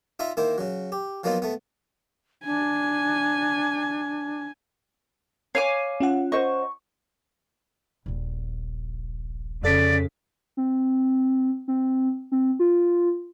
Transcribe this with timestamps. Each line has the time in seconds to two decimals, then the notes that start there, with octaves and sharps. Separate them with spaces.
0.19 D#4 F4 E5 A#5
0.37 D#3 A#3 E4 C5
0.58 C#3 F#3
0.92 G4
1.24 F3 F#3 A#3 B3 D#4 F4
1.42 A3 B3
2.45 D4 G#5
5.55 C#5 F5 G#5 D6
6.00 C#4 F4 F#5
6.32 C5 D#5 C#6
8.06 D#1 A#1
9.63 F2 C#3 A4 D5 B6
10.57 C4
11.68 C4
12.32 C4
12.59 F4